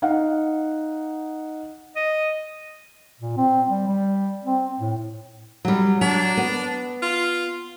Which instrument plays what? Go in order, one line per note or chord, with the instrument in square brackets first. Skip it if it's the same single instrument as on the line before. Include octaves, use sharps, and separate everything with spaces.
[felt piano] D#4 F5 F#5
[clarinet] D#5
[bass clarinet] A#2
C4
G3
G3
C4
A2
[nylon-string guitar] F#3 G3
[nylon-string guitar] F#3 [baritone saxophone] D4
[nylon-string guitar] B3
[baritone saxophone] F4